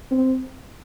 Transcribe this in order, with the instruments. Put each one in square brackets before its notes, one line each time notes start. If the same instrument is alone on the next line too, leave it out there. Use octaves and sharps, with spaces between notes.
[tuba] C4